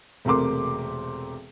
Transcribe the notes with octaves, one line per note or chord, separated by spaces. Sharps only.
E1 C3 A3 A#4 C6 D6